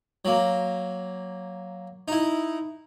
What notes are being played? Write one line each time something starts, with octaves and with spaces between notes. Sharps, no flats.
F#3 A#3
D#4 E4